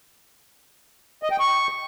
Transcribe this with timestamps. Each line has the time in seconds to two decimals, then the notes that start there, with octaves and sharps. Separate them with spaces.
1.23 D#5
1.31 G5
1.40 C#6